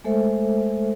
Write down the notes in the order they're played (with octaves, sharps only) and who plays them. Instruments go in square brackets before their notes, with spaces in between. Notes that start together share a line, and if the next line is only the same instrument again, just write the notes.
[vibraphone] G#3 A3 A4 C5 E5